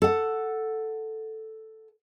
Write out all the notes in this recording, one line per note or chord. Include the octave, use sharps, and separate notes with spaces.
A4 F#5